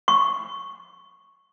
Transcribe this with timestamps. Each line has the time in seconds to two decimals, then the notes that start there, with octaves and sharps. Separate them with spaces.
0.08 C#6